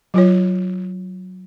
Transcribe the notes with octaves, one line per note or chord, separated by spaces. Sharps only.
F#3 F4 C#5